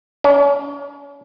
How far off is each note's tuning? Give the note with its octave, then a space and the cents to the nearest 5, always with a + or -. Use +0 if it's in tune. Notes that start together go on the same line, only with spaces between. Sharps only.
C#4 +40